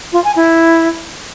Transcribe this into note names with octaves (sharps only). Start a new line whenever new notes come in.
F4
G#5
E4